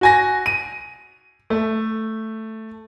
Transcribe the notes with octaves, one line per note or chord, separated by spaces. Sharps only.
F#4 G#5 A#6
D#7
A3